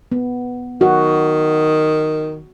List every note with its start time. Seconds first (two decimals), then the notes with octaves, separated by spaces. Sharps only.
0.12 B3
0.81 D#3 F#4